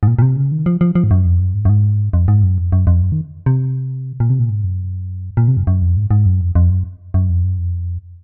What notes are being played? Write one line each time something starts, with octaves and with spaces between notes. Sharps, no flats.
G#2
A#2
A#2
C3
C#3
D#3
F3
F3
F3
G#2
F#2
F2
F#2
G#2
F#2
G#2
F2
G#2
F#2
F2
F#2
F2
F#2
D#3
C3
A#2
C3
A#2
G#2
F#2
A#2
C3
F#2
F#2
F2
G#2
G#2
F#2
F2
F2
F#2
F#2
F2
F#2
F2